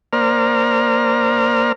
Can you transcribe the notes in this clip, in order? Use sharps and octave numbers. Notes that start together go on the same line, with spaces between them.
A#3 C5 D5 A#5 F6